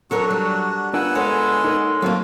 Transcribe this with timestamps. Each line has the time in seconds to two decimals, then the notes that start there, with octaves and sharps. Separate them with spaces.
0.11 F#3 D4 F#4 A4 A#4 C#5
0.31 G3
0.94 B3 D4 F4 A#4 F#5 G#5 E6
1.15 G#3 A4 C#5
1.64 D#4 A#4 F#5
2.02 F#3 A3 A#3 C4 F4